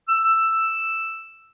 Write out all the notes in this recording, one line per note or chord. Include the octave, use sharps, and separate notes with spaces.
E6